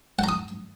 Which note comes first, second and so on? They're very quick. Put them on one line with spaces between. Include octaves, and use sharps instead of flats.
F#5 A#5 D#6